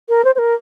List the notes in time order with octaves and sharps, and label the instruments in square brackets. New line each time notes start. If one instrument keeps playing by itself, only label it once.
[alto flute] A#4
C5
C5
A#4